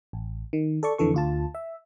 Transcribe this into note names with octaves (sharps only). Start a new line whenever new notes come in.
A1
D#3
A4 D5 C#6
F2 D3 E3 A4 C#6
D2 F4 A5
E5